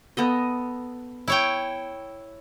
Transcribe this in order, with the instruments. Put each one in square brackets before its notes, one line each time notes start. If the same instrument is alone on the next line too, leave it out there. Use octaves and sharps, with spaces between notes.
[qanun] B3 A4 D#5
[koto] E4 C#5 G5